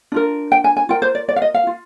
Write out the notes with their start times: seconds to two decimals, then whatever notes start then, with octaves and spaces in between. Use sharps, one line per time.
0.12 D4 F4 A#4
0.52 G5
0.64 G#5
0.77 G#5
0.89 F4 A#4 G5
1.02 C5
1.15 D5
1.28 D5
1.36 F5
1.42 D#5
1.54 F5
1.67 F4